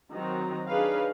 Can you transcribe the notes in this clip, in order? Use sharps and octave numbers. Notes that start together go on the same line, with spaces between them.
D#3 F#3 C4 F#4 A#5
D4 D#4 G#4 B4 C#5 F5